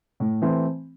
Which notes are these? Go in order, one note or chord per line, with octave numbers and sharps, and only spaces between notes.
A2
E3 A3 C4